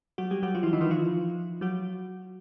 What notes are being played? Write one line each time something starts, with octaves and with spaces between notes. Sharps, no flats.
F#3 F#4
G3 G4
F#3 F#4
F3 F4
E3 E4
D#3 D#4
E3 E4
F3 F4
F#3 F#4